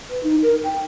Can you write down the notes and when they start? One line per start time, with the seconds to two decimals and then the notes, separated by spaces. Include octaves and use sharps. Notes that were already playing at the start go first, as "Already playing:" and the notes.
0.10 B4
0.23 D#4
0.42 A#4
0.64 G5